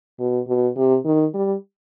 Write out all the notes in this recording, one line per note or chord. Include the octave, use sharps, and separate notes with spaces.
B2
B2
C3
D#3
G3